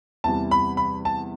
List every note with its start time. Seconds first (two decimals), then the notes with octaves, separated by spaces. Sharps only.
0.24 E2 C3 E3 G3 A5
0.51 B5
0.77 B5
1.05 A5